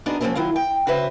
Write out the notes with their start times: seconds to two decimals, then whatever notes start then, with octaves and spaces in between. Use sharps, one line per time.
0.06 B3 D4 D#4 F#4 G#4 A#4
0.21 F3 F#3 G#3 A#3 C4 C#4
0.35 D#3 F#3 E4 F4
0.56 G5
0.87 C#3 F#4 B4 C5 E5